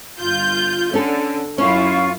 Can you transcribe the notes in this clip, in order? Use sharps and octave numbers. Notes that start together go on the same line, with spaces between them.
G1 F4 G6
D3 C#4 A4
F#2 C#4 E4 F4 F5 C#6